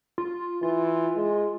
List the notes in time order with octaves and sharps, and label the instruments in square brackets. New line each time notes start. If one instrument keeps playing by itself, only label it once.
[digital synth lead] F4
[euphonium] E3 [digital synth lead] F4
[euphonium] G#3